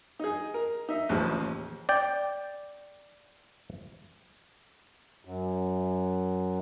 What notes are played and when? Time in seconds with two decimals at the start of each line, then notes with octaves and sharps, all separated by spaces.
0.19 D#4 G#4
0.54 A#4
0.89 D#4 E5
1.09 A1 D#2 C#3 F3
1.89 D5 G5
5.25 F#2